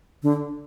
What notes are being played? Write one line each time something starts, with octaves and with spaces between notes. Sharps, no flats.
D3